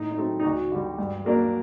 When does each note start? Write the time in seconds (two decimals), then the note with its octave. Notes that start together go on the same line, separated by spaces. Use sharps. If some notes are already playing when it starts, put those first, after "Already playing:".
Already playing: A2 D#4
0.11 D#4
0.17 F#3 A3 C4
0.40 D#4
0.44 D2 F#4
0.72 D3 G3
0.98 G2
1.25 F#3 A#3 D4